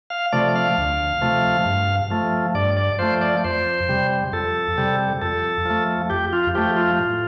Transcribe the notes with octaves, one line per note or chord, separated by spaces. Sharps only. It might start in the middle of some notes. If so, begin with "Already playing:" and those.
F5
C3 F3 A3 D5
F5
D2
C3 F3 A3
G2
F3 A3
G2 D5
D5
F3 A3 C5
D5
F2 C5
C3 G3
F2 A4
C3 G3
F2 A4
F3 A3
F2 G4
F4
F3 A3 G4
F4
A2